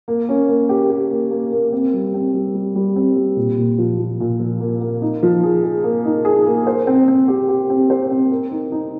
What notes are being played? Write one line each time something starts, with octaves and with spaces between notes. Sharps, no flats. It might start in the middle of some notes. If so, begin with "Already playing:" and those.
A#3
C#4
A#3
G4
G4
A#3
A#3
A#3
C4
G3
C4
G3
G3
G3
C4
G3
A#2
A#2
F3
F3
A#2
F3
A#3
A#3
D#4
F3
G#4
G#4
A#3
D#4
G#4
A#3
C5
C4
C4
G4
G4
C4
C5
C4
A#4
D#4
D#4